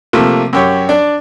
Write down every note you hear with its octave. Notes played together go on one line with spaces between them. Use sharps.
C3 F3 A3 A#3
F#2 G4 C#5
D4 D5